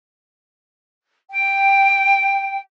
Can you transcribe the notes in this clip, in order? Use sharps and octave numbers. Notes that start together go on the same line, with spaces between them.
G5